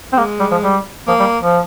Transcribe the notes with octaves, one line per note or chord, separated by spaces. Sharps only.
C4
G#3 A#3
G3
F3
G3
F3 A#3
G3
F3